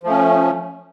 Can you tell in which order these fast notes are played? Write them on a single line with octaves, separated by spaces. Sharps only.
F3 A3 C#4